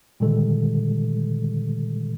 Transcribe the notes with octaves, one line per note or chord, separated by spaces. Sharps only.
A#2 D3 D#3 G3 G#3 A4